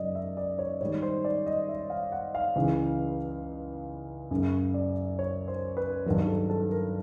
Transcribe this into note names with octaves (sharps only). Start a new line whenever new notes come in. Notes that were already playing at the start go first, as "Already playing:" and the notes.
Already playing: F#2 C#3 F#3 D5 D#5
E5
D5
C#5
G#2 D#3 G3 C#5
C5
D5
D#5
E5
F5
F#5
F5
C#2 C#3 E3
F#2 C#3 F#3
D5
C#5
C5
B4
G2 D#3 F#3 A#4
A4
A4
A#4